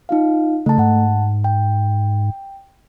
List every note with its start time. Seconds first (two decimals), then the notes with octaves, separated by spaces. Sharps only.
0.09 D#4 F4 F5
0.66 C#3 A3 A5
0.78 G#2 F#5 A5
1.44 G5